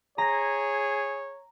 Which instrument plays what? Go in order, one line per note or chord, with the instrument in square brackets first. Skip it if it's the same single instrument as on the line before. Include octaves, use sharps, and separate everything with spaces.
[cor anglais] G#4 [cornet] C#5 [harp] A#5 A#6